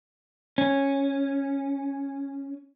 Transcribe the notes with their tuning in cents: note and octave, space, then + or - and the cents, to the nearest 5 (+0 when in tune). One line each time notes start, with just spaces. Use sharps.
C#4 -5